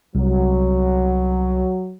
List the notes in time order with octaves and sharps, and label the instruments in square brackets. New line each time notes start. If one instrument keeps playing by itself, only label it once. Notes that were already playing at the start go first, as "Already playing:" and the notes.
[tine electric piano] C2 [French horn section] F#3